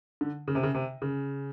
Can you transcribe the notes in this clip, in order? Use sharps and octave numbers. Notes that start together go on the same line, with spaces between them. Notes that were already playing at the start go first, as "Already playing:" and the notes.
D3
C#3
C3
C#3
C3
C#3